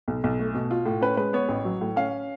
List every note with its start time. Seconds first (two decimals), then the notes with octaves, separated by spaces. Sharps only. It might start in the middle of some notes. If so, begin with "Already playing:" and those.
0.08 B1
0.24 B1
0.40 A3
0.55 B2
0.71 F4
0.86 A2
1.01 C#4 B4
1.17 G#3 B4
1.33 B3 C#5
1.49 A1
1.65 F#3
1.81 A2
1.96 C#4 F5